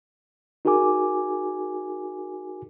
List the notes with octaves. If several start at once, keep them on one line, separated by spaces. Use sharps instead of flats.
D#4 F#4 G#4 A#4 G#5 D6